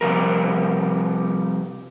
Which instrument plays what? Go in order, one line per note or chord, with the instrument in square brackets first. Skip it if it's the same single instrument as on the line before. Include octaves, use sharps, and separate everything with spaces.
[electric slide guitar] C3 F3 G3 A#4